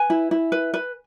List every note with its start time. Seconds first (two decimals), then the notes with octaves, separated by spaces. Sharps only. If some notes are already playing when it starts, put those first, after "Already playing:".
Already playing: B4 G#5
0.10 E4
0.31 E4
0.52 B4
0.74 B4